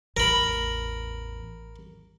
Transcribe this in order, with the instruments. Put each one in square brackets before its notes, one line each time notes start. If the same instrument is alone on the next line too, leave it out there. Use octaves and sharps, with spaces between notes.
[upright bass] A1 E2 [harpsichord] A#4 B5